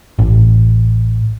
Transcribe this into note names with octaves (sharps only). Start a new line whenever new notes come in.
A1